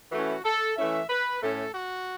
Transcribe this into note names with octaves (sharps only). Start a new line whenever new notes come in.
E3 A3 C#4 E4 F#4
A4
E3 A3 C#4 E4 E5
B4
A2 A3 C#4 A4
F#4